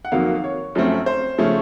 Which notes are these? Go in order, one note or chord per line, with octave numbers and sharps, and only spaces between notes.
F#5
F2 D#3 F#3 A#3 F5
C#5
F#2 F3 A3 C4
C5
C#3 F3 A3 C#4